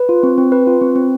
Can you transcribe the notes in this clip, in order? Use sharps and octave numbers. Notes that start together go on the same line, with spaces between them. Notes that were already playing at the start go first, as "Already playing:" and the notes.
Already playing: B4
F4
C4
C4
B4
F4
C4
C4